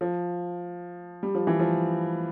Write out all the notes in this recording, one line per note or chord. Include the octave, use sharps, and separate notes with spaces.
F3
G3
F3
E3
F3